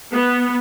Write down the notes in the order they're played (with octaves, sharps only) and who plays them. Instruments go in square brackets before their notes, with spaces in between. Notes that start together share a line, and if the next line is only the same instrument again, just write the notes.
[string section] B3